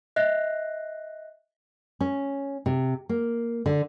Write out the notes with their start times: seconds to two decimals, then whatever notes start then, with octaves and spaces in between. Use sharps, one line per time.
0.16 D#5 E5 F#6 A#6 C7
2.01 C#4
2.66 C3
3.09 A#3
3.66 D3